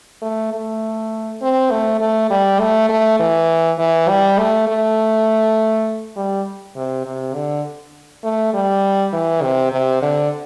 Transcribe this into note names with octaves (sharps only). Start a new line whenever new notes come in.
A3
A3
C4
A3
A3
G3
A3
A3
E3
E3
G3
A3
A3
G3
C3
C3
D3
A3
G3
E3
C3
C3
D3